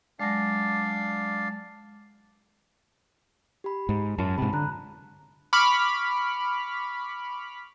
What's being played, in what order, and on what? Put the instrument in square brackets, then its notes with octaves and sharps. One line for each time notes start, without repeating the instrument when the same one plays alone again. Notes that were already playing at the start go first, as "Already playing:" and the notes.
[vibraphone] F#3 G#3 [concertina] D4 D5 F5
[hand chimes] G4 B5
[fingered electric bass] G#2
[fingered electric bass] F#2 [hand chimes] F4 A5
[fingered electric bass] G#2 C3 [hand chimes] B5
[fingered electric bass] D3 [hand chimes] A#5 F#6
[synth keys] B5 C#6 D6 F6